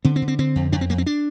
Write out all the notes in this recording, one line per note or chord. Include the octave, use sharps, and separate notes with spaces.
D3 C4
C4
D3
C4
D3 C4
F2
F2 D4
C4
F2 A#3
C4
D4